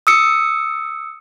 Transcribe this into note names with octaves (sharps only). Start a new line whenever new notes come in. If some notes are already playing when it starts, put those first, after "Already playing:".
D#6 E6 C#7